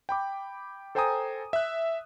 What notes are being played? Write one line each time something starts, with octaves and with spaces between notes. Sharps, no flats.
G5 B5 D6
A4 C5 G5 G#5 A#5 D#6
E5 F#6